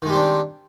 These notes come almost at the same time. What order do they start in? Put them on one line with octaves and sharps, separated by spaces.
D#3 G#3 G3 C4 D4